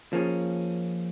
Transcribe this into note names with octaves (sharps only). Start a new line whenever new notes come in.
F3 A#3 C#4 G#4